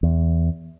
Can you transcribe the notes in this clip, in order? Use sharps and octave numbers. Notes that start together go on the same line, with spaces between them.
E2